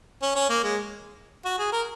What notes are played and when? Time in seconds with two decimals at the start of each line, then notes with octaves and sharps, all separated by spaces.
0.22 C#4
0.36 C#4
0.50 A#3
0.63 G#3
1.45 F#4
1.59 G#4
1.72 A#4